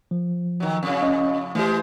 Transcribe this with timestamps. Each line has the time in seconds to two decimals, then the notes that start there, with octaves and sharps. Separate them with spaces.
0.11 F3
0.60 D#3 F#3
0.83 F2 A2 C#3
1.02 C#4 D#5
1.55 E3 G#3 A3 G4 C5